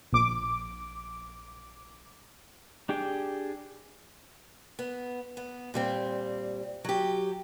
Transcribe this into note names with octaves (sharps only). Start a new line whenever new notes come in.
A#1 D6
D4 G4 G#4 G5
B3
B3
A#2 G3 C4
F#3 G4